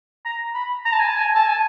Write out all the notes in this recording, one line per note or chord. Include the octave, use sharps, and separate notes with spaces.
A#5
B5
A#5
A5
G#5
A5
G#5
A5
G#5